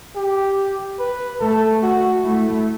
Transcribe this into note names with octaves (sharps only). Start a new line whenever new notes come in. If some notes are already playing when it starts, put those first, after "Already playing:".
G4
B4
A3 A4
F#4
A3 E4